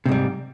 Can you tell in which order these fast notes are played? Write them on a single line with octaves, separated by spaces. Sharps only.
C3 G#2 G3